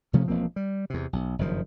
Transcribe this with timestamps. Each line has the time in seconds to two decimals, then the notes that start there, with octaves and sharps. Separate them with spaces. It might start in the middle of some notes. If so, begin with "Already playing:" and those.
0.13 C3 F3 A3 C#4
0.28 E1 F3 A#3 C4
0.56 G3
0.90 E2 C3
1.13 B1
1.39 F#1 G2 D#3 F3